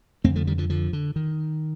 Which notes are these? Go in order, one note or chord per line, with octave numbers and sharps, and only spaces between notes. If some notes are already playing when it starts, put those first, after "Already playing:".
F2 D3 A3 C4
F3 A3
D#3 G3
D3 F3
D3 F3
D3
D#3